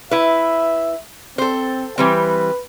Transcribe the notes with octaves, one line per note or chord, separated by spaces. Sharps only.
E4 B4 E5
C4 A4 C5
E3 G3 C4 B4